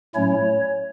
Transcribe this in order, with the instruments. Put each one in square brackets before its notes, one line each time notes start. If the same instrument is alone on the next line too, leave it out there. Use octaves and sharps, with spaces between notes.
[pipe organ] A2 F#3 A3 C#4 E4 C#5